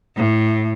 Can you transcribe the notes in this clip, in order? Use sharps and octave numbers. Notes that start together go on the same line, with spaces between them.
A2